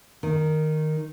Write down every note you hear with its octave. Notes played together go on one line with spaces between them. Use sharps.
D#3